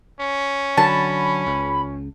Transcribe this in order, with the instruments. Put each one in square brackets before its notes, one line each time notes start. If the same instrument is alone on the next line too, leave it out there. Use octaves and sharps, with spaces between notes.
[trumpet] C#4
[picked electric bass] D3 F#3 [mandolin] A5 [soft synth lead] B5
[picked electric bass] C#2